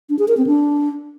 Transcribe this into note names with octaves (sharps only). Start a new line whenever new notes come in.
D4
G#4
A#4
C4
D4